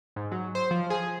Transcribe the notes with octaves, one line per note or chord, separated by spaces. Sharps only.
G#2
F#3
C5
F3
G#4